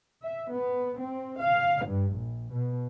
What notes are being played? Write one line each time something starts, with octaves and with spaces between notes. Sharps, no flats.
E5
B3
C4
F5
G2
A#1
B2